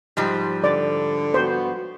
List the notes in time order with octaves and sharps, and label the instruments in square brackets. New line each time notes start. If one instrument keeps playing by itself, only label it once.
[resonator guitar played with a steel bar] G#2 F3 G3
[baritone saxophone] D3 [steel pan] D5
[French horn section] B3 F#4 [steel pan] C5